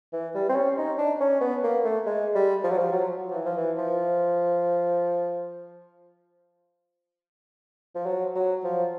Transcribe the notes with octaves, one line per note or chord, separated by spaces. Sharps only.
E3
G3
C4
C#4
D#4
D4
C#4
B3
A#3
A3
G#3
G3
F3
F#3
F3
F#3
F3
E3
F3
E3
F3
F3
F#3
F#3
F3